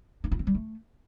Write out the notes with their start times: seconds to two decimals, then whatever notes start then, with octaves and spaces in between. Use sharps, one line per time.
0.24 D#4
0.32 F4
0.39 C4
0.47 G3
0.55 A3